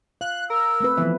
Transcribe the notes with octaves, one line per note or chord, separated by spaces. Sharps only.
F5 F#6
A#4 E6
A3 C4 B4
E3 F3 B3 E5